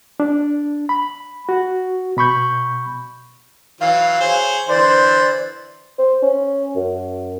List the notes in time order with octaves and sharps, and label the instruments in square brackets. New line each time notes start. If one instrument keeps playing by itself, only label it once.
[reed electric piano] D4
B5
F#4
B2 B5 C#6 G6
[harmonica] E3 F#3 [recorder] F5
[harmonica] G#4 C5 C#5
[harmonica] D3 E3 [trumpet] C5 [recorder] D5
[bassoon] C5
C#4
F#2